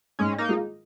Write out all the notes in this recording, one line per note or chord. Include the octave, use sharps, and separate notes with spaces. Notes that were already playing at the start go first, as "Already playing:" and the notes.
G#2 G#3 C#4
A#3 D#4
G#3 F4 G#4